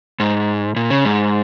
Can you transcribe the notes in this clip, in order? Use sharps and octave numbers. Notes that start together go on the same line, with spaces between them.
G#2
A#2
C#3
G#2